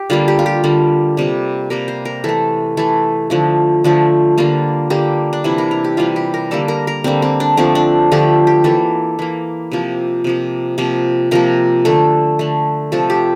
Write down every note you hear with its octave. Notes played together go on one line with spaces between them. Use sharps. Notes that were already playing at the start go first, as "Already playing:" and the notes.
Already playing: G4
D3 G3 A#3 F4
G4
F4
G4
D3 G3 A#3
C3 G3 A#3
C3 G3 A#3 A#4
C5
A#4
E3 A3 A4
E3 A3 A4
D3 F3 A3
D3 F3 A3
D3 G3 A#3 F4
D3 G3 A#3 G4
D4
C3 E3 G3 E4
A#4
A#4
G4
C3 E3 G3 F4
G4
A#4
D3 G3 A#3 A4
A#4
A#4
D3 G3 A#3 C4
C4
D4
D3 F3 A3 C4
D4
D3 F3 A3 G4
G4
E3 A#3 A4
E3 A#3
C3 F3 A#3
C3 F3 A#3
C3 F3 A#3
C3 F3 A#3 A#4
D3 A3 A4
D3 A3
C3 F3 A3 A4
G4